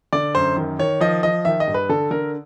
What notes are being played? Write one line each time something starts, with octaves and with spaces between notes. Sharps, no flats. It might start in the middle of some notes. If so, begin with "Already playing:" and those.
D3 D5
F#2 C5
D#3
D#3 C#5
F3 D#5
F3 D#5
D#3 E5
D#5
G2
B4
D3 A4
D3 A#4